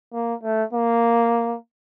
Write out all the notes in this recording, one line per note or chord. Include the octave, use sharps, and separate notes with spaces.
A#3
A3
A#3